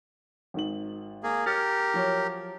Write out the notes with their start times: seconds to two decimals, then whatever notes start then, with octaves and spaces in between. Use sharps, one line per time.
0.54 G#1 D#3 F#7
1.23 A#3 G#4
1.46 G4 A#4 F6 A6 C#7
1.94 F3 F#3 C#5